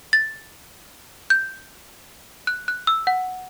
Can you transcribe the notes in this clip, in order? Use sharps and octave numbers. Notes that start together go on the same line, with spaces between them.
A6
G6
F#6
F#6
E6
F#5